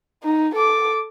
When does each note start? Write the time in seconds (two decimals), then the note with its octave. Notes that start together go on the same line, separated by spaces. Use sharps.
0.23 D#4
0.55 A4 D6